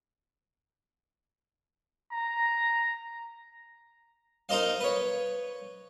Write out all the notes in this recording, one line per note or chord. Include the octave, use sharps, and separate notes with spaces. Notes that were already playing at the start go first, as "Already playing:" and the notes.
A#5
D#4 A#4 C5 D#5 F5
B4 C#5